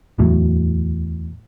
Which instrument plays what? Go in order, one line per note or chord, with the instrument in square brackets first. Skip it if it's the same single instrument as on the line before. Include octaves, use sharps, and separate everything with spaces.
[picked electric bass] D1 E2 A2 F#3